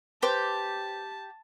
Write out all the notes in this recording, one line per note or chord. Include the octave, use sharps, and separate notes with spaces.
G4 B4 C5 A5 D6